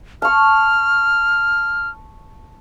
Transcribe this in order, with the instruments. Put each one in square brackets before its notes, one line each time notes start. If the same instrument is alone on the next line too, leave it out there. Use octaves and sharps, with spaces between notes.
[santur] A5 C#6 [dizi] F6